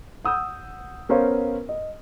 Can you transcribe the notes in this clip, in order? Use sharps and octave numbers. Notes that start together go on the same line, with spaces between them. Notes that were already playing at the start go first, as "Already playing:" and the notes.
F#5 D#6 E6 G6
B3 C#4 A#4 C5 C#5 F5
D#5